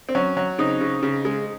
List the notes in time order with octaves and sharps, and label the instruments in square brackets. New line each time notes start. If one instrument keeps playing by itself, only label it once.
[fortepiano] C4
F#3 C#4
F#3
C#3 C4 D#4
C#3
C#3
G#3